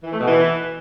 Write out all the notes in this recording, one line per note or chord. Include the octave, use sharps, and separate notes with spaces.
E3
A3
B2
E3